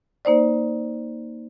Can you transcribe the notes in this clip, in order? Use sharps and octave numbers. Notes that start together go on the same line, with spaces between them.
A#3 D#4 C5 D5